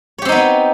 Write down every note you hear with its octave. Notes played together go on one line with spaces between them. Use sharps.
B3 C4 D#4 G4 C#5